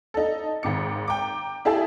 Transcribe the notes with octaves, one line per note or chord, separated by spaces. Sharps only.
D#4 A4
G#1 G#2 D#3 D6 C#7
G5 A#5 D6
E4 G4 G#4 E5 A5